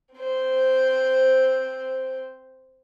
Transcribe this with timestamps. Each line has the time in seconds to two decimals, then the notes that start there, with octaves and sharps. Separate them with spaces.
0.15 C4 C5